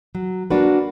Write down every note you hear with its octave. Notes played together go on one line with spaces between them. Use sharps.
F#3
A#3 D4 F#4 B4